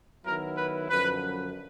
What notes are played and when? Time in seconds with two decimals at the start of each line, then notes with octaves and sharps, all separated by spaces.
0.25 D#3 F#3 B3 E4 A#4
0.57 B4
0.90 F#2 D3 F3 B4